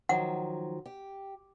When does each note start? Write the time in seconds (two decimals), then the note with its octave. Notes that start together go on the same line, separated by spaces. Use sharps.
0.09 D#3 F3 F#3 F#5
0.85 G4